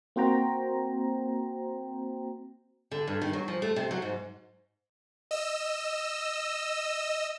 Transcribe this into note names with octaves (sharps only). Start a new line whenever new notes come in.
A#3 C4 F#4 C5 G5 A#5
D3
G2
D#3
F#3
F3
A3
C3
F#3
G#2
D#5 E6